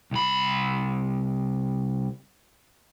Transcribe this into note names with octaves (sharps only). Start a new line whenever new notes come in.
C2 B5